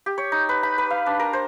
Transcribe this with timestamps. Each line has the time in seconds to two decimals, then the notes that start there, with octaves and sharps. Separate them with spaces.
0.06 G4
0.18 C#5
0.32 D#4
0.49 B4
0.63 B5
0.78 B4
0.90 F5
1.06 D4
1.20 A#4
1.33 C5